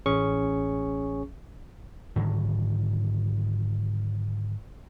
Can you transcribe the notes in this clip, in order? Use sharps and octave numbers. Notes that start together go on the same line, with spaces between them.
A1 C#4 G#4 C#6
G#2 D3 D#3 F#3